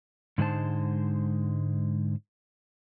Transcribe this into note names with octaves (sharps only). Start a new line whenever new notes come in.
G#2 D3 G#3 D#4 C5 A5